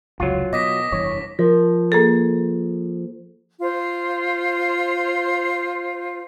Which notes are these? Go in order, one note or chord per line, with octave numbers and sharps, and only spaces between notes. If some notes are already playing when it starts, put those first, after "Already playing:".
F1 C#2 F#3 F4
B2 D#5 D6 D#6 A#6 B6
F1 G2 E3 C#5
F3 A#4
A#3 G#4 A4
F4 C5